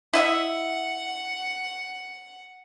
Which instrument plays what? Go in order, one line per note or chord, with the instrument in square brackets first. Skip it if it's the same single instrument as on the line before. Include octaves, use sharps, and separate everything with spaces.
[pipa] E4 D#5 E5 [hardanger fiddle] F#5